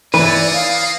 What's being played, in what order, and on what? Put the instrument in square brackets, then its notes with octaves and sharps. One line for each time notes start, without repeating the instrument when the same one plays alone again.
[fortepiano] E3 [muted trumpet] A#3 [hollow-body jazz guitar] B4 [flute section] C#5 D5
[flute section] F5 D#6